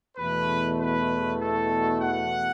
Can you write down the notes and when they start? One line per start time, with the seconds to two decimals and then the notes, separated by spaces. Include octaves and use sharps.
0.17 E2 B2 A3 B4
0.78 B4
1.41 A4
2.01 F#5